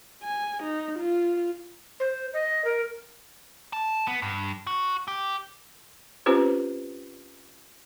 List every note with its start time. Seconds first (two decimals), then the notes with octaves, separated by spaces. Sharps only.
0.23 G#5
0.63 D#4
0.99 F4
2.00 C5
2.34 D#5
2.65 A#4
3.73 A5
4.07 B3
4.22 G2
4.67 F#4
5.08 G4
6.26 C4 C#4 F4 G4 B4 C5